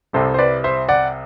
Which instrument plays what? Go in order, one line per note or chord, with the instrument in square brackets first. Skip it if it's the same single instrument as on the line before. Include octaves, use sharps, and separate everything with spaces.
[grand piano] C2 C3 G3 A4 C5
C5
B4 D5
C5 E5
D5 F#5